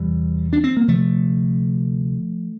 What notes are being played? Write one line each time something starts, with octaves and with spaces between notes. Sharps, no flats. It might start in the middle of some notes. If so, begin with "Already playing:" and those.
Already playing: E2 C3 E3 G3
D4
C4
A#3
D2 C3 F3 A3